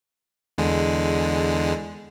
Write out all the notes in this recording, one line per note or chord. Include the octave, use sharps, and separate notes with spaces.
E2 D3 G#3